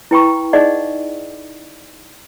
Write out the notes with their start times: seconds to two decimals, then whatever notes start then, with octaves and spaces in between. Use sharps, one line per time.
0.11 E4 B4 G5 A#5 B5 C#6
0.53 D#4 G#4 D5 D#5 F#5